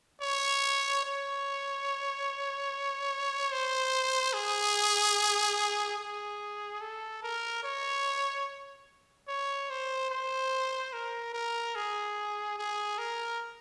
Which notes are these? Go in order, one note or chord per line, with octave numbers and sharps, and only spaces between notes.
C#5
C#5
C5
G#4
G#4
A4
A#4
C#5
C#5
C5
C5
A#4
A#4
G#4
G#4
A#4